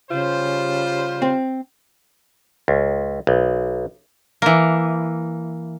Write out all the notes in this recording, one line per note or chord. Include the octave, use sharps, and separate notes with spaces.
C#3 G3 F4 C5
C4
C#2
B1
E3 A#3